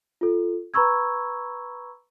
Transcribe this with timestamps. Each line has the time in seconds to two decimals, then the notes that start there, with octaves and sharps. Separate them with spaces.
0.21 F4 A4
0.74 B4 A#5 B5 C#6 E6 G#6